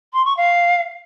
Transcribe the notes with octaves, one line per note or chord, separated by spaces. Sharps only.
C6
C#6
F5